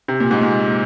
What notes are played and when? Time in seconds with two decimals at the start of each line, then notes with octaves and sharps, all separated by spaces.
0.08 C3
0.20 A#2
0.31 G#2
0.41 A#2